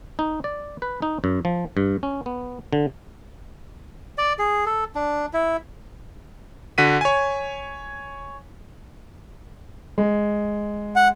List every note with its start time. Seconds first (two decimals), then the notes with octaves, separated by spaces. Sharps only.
0.19 D#4
0.44 D5
0.82 B4
1.02 D#4
1.24 F#2
1.45 F3
1.77 G2
2.03 C#4
2.26 B3
2.73 D3
4.18 D5
4.39 G#4
4.66 A4
4.95 D4
5.33 E4
6.78 D3 F#4 B6 D#7
7.01 C#5 G#5
9.98 G#3
10.96 F#5